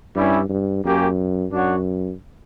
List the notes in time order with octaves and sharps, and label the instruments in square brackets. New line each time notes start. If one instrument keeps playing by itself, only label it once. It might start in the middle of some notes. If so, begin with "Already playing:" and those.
[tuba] G2 [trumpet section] G3 C#4 E4
[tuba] G2
[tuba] F#2 [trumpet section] A#3 C#4 G4
[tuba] F#2 [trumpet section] D4 F#4 C#5 F#5